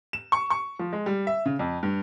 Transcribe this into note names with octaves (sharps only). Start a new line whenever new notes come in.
E7
C#6
C#6
F3
G#3
G3
E5
C#3
F2
G2